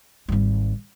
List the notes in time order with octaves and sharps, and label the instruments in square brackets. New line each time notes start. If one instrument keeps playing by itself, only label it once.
[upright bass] G#1 G3